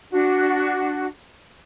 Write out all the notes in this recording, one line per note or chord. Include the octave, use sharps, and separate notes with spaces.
D4 F#4